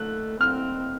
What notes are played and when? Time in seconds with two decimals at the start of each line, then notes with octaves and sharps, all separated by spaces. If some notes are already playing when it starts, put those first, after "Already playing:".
Already playing: A3 F#6
0.40 C4 F6